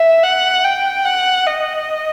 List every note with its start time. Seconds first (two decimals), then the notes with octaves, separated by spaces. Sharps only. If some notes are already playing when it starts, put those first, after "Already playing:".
Already playing: E5
0.23 F#5
0.64 G5
1.05 F#5
1.47 D#5